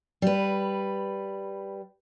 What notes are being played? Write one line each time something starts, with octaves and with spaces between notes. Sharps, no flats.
G3 B4